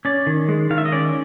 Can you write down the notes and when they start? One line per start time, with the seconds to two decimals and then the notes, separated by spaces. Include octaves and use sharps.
0.05 C#4 D5
0.27 D#3
0.49 G#3
0.70 D#3 F5
0.78 E5
0.85 D#5
0.92 C#4 D5